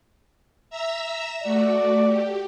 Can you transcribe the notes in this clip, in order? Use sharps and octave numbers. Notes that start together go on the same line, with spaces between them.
E5 A#5 E6
A3 F#4 D5
G4